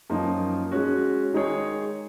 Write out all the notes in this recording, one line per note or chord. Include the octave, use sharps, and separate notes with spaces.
F#2 F3 A#3 D#4 A#4
G#3 C#4 F#4
D#3 G#3 D#4 G#4 C#5